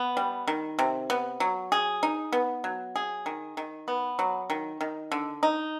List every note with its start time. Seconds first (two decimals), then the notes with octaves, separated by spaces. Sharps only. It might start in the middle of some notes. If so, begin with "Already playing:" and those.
Already playing: B3
0.17 G3
0.47 D#3
0.79 C3
1.10 B3
1.40 F#3
1.72 G#4
2.03 D#4
2.33 B3
2.64 F#3
2.96 G#4
3.26 D#3
3.57 D#3
3.88 B3
4.19 F#3
4.50 D#3
4.81 D#3
5.12 D3
5.43 D#4